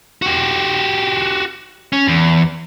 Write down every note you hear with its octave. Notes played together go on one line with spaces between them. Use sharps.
F#4 G4
C#4
E2